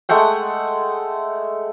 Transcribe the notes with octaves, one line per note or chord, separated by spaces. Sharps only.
G#3 A3 F#5 G5